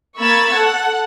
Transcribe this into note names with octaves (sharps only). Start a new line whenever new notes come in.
A#3 B5 C#6 E6 G#6 A6
A4 F#5